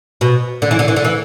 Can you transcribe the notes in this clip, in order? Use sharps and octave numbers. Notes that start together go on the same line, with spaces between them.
B2
D3
E3
D3
E3
D3
E3